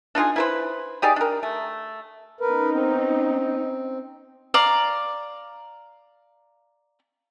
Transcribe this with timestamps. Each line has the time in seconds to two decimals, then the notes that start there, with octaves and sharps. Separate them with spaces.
0.15 D4 D#4 F4 G#4
0.36 E4 B4 C5
1.02 D#4 G4 G#4 D5
1.16 D4 A#4
1.43 A3
2.41 B3 C#4 D#4 A#4 B4
2.73 C4
4.54 D5 F5 A#5